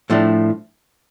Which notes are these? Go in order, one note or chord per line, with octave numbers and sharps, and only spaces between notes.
A2 F3 A3 D4